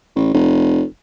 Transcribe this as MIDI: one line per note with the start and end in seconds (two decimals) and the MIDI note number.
0.16 0.32 33
0.34 0.83 29